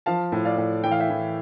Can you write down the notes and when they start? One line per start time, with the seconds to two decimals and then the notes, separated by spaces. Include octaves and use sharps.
0.06 F3 F5 A5
0.32 A2
0.45 D5 F5
0.58 A2
0.83 E3 G5
0.91 F5
1.00 E5 G5
1.10 E3